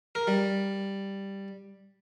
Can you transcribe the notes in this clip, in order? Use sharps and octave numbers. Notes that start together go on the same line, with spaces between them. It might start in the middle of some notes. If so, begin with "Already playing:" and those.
A#4
G3